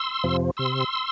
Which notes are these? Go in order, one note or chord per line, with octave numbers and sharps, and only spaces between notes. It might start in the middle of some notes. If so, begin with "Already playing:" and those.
Already playing: C6 E6
F2 C3 F3
C3 C6 E6